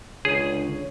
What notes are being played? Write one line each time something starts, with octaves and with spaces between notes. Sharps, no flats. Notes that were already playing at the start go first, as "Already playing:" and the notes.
C#2 D3 G#4 C#5